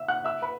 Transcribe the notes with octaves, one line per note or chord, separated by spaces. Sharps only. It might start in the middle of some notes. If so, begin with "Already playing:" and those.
Already playing: E5 E6
F#5 F#6
E5 E6
B4 B5